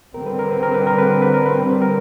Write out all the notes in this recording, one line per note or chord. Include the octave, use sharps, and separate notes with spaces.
D3 G3 C4 A#4
B4
A#4
B4
A#4
B4
A#4
B4
A#4
B4
A#4
B4
A#4
B4
A#4